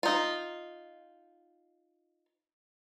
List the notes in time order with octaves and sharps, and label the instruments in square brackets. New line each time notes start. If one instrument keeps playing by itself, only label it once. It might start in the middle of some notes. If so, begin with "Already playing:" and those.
[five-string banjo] D#4 F4